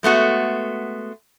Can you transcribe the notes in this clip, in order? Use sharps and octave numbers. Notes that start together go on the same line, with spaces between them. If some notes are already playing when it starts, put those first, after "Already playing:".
G#3 A3 B3 F#4